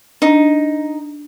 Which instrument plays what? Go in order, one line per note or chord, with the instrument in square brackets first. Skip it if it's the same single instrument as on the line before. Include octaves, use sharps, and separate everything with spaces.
[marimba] D4 [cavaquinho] D#4